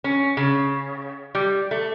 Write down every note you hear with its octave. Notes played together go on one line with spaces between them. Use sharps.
C#4
C#3
G3
A3